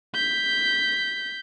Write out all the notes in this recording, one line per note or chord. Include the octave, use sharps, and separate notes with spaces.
G6 B6